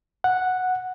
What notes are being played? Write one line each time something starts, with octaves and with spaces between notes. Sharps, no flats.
F#5